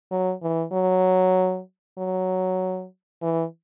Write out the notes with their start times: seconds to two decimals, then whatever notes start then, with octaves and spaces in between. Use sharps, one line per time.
0.11 F#3
0.42 E3
0.72 F#3
1.98 F#3
3.22 E3